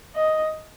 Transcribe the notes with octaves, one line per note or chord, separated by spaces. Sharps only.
D#5